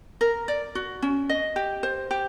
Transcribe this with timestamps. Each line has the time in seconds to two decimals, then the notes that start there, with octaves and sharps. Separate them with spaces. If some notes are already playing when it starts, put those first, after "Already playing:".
0.21 A#4
0.48 D5
0.75 F#4
1.02 C#4
1.29 D#5
1.56 G4
1.83 C5
2.11 G4